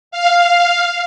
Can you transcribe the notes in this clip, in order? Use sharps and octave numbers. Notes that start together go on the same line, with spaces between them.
F5